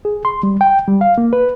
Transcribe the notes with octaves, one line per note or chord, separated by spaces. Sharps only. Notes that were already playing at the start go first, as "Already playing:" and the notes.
G#4
C6
G3
G5
G3
F5
A#3
B4